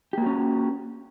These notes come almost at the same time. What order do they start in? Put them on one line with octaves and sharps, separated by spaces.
G4 A#3 F#4 C#4